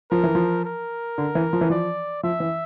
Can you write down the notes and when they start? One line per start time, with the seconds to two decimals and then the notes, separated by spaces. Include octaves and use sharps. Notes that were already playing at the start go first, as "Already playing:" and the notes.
0.11 F3 A#4
0.24 E3
0.35 F3
0.65 A#4
1.18 D3
1.35 E3
1.53 F3
1.61 E3
1.70 F3 D5
2.23 F3 E5
2.40 E3